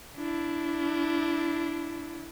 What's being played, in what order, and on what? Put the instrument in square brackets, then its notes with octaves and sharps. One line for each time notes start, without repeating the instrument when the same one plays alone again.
[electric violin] D4 E4